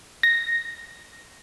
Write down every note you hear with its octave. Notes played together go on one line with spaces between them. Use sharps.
A#6